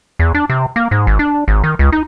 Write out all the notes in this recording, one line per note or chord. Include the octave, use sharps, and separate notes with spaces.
E2
D4
C3
A#3
G#2
G#1
D4
G#1
D#3
C#2
D#4